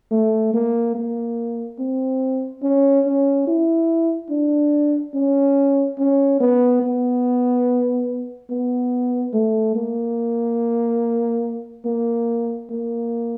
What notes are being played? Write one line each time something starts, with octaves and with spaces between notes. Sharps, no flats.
A3
A#3
A#3
C4
C#4
C#4
E4
D4
C#4
C#4
B3
B3
B3
A3
A#3
A#3
A#3